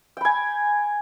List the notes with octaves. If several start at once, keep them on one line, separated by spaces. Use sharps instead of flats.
G5 G#5 B5